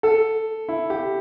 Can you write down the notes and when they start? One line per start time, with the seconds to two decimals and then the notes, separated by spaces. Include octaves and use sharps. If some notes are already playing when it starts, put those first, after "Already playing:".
0.03 A4
0.69 E4
0.90 G4